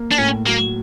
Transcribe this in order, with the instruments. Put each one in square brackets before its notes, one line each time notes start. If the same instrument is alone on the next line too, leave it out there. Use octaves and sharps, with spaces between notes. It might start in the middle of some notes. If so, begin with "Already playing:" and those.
Already playing: [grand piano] A#3
[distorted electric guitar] D4
[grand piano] A2 [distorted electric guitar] C#4
[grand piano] F#3 [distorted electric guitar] A#3